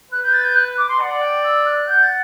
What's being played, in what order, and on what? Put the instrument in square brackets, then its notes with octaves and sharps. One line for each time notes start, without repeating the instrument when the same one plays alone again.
[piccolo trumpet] B4 [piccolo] F#6
[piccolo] G6
A6
G6
F#6
D6
C6
[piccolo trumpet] D5 [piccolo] F#5
[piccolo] G5
E6
F#6
[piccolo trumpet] F#5 [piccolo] G6
[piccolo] A6